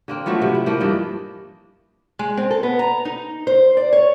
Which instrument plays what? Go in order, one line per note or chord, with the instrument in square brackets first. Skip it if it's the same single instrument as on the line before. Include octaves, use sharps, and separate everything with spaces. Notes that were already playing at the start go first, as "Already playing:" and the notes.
[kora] D3 A#3 C4
F3 F#3 A3 B3
C3
E4
F3 A3 A#3 D4
G2 E3 D4 D#5
[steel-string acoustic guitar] G#3
C4
A4
B3
A#5
D#4
C5
D5
C#5